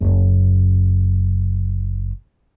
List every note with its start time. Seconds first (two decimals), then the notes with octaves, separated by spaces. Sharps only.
0.01 F#1 F#2